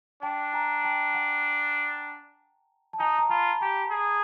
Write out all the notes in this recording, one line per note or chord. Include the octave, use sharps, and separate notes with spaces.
D4 G5 A5
G#5 A#5
G5 A5
G5
F#5 G#5
A5
D#4 G#5 A#5
A#5
F4 A5 B5
G4 G#5 A#5
G#4